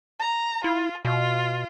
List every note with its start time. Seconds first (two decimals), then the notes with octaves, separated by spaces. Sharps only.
0.20 A#5
0.64 E4 F4
1.05 B2 F4